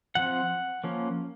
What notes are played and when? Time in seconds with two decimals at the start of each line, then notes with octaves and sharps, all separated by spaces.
0.15 F3 C4 F#5
0.84 F3 A#3 C#4